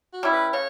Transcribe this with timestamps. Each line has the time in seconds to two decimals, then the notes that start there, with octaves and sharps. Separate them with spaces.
0.13 F#4
0.23 G3 C#4 E4
0.33 B4
0.53 C#3 C#5